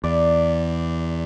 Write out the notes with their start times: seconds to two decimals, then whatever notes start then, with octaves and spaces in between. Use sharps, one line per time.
0.04 E2 D5